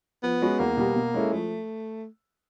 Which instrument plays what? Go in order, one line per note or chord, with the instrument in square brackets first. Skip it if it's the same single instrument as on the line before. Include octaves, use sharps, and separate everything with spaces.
[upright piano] F3 [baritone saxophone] B3
[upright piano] G#3 C#4 F#4 B4
[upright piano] E2 [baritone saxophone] A#3
[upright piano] B2 G3 B3
B2
G#3 C#4 E4 A4
[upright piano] F3 [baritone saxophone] A3